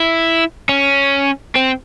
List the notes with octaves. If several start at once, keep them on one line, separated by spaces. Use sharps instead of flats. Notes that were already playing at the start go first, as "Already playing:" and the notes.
Already playing: E4
C#4
C4